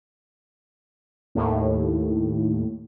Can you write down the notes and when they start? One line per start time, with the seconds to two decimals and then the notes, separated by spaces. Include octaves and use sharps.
1.35 D#2 A2